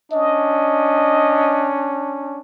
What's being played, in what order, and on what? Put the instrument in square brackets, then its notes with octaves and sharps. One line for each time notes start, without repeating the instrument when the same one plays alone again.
[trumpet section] C#4 D4 [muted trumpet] D#5